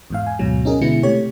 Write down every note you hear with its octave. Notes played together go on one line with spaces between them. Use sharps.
E2 G#2 F5
G#5
D2 G#2 B2 F#3
C#4 D#4 G#4 A#4
B2 D3 G#3 B3 E4 C#7
C3 A3 G4 C#5